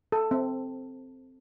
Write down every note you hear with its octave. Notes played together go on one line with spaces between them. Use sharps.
A4
C4